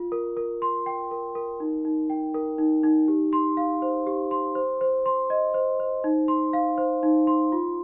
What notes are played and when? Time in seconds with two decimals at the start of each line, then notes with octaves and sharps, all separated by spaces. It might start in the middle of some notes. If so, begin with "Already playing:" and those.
Already playing: F4
0.12 A#4
0.37 A#4
0.62 C6
0.86 G5
1.11 A#4
1.35 A#4
1.60 D#4
1.85 D#4
2.10 G5
2.34 A#4
2.58 D#4
2.84 D#4
3.08 G4
3.33 C6
3.57 F5
3.82 C5
4.07 G4
4.31 C6
4.55 C5
4.81 C5
5.06 C6
5.30 D#5
5.54 C5
5.80 C5
6.04 D#4
6.28 C6
6.53 F5
6.78 C5
7.03 D#4
7.27 C6
7.52 F4